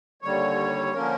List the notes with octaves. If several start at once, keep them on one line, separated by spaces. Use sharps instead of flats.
D#2 D3 G3 C#5
D3 F3 A#3 C#4 A#4